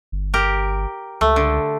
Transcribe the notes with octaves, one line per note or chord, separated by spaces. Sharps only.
G1
G4 A#4
C#2 A3
D3